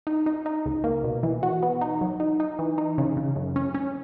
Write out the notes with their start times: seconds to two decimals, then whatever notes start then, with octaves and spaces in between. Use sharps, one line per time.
0.07 D#4
0.26 D#4
0.46 D#4
0.66 C#2
0.84 A#3
1.04 B2
1.23 E3
1.43 F#4
1.63 B3
1.81 D#4
2.01 F#3
2.20 D#4
2.40 D#4
2.59 E3
2.78 D#4
2.98 C#3
3.17 C#3
3.36 F#2
3.56 C#4
3.74 C#4